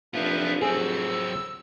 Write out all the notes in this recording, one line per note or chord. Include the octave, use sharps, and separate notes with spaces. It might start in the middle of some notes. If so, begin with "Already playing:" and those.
F1 F3 D4 F4 B4 E5
F#3 C4 G#4 E6